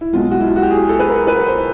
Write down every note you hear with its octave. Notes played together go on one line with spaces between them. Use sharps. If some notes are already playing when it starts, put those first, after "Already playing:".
E4
B1 B2 G#3 F4
F#4
E4
F4
F#4
G4
G#4
A4
B4
A#4
B4
C5